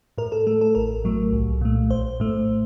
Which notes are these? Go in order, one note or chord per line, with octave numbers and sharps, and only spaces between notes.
A2 A#4
A4
A3 A4
A4
A1 A#4
A2 F#3 A3
C2
A#2 A3
A#1 C5
A2 A3